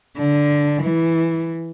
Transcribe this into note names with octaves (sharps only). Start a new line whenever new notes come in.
D3
E3